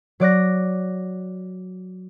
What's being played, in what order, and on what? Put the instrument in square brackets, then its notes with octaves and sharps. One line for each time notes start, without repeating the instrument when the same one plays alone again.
[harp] F#3 D5 F#6 A#6